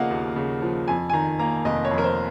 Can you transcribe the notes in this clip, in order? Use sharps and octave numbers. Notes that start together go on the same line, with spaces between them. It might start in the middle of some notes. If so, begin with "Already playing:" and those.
Already playing: C#3 F3 A#3 D#5 F5 F#5
D#2
C#3
F3
F2 G#5
G#5
D#3 A#5
A#3 A#5
F1 D#5
C#5
F2
A#4
C5